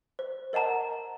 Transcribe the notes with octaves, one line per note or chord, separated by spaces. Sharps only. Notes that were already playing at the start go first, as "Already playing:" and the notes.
C5
A#4 D#5 F#5 A5 A#5